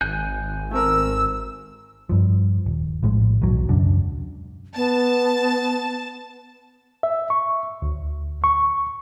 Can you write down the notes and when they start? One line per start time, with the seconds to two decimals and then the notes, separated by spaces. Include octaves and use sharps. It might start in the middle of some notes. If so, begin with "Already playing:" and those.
0.01 G#1 G#5 F#6 G6
0.71 A3 C4 A#4 E6
2.09 G2 F3
2.66 D#1
3.03 A#1 A2 G#3
3.42 B1 E2 F#3
3.69 E1 C#2 F#2 D4
4.76 B3 A5
7.03 E5
7.30 C#6
7.82 D2
8.44 C#6